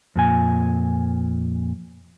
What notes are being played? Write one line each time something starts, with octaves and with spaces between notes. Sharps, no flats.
F2 A#2 G#5